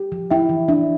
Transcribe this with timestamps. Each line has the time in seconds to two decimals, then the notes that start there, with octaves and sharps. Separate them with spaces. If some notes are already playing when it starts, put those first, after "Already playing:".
Already playing: G4
0.12 F3
0.30 E4 E5 G5
0.49 E3
0.68 D4 E5